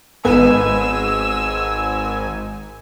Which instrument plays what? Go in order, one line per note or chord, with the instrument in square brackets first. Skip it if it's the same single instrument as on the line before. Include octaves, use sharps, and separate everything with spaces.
[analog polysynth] G#1 G#2 G#5 [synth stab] B3 [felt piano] B4 [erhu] E6